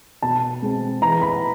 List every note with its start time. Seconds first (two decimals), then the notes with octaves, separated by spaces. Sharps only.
0.22 B2 A5
0.62 G#3 C4
1.02 E3 A#5
1.22 B5